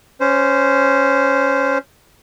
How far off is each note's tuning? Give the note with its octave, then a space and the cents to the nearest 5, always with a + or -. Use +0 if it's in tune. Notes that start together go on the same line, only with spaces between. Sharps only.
C#4 +0 C5 -15